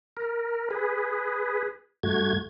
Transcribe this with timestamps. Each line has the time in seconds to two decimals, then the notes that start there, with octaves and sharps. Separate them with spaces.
0.17 A#4
0.71 G#4 B4
2.03 G2 A3 F#4 G#6